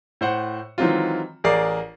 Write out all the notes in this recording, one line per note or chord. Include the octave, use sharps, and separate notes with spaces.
A2 C5 F#5
D#3 E3 F#3 G#3 C4 F4
A1 G#4 A#4 D5 C7